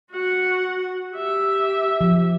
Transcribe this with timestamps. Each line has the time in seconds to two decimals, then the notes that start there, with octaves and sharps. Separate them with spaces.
0.10 F#4 F#5
1.15 G4 E5
2.01 F3